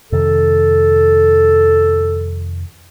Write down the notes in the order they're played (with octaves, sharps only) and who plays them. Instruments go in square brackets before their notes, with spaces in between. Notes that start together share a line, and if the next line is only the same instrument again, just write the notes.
[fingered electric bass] F2 C3 D#3 [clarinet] A4